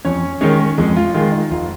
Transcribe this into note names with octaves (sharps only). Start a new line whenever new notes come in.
F2 C#4 C#5
D#3 G#3 C#4 C#5
F2 G#3 G#4
F4
D#3 G#3 F4
D#4
F1 F4